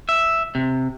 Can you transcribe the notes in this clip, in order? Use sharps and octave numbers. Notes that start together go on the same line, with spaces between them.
E5
C3